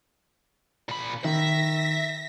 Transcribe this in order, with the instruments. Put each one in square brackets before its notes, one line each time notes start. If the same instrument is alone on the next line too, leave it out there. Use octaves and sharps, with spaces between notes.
[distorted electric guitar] A#2 B5
[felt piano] D#3 [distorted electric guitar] E5 [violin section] A#6 B6